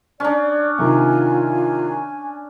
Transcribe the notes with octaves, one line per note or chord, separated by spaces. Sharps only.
C#4 D4 D5
C3 D#3 F4 G#5